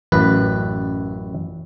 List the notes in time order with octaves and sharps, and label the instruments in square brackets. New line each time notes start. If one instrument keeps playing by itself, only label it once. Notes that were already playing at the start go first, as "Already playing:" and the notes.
[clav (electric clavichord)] A1 F#2 B4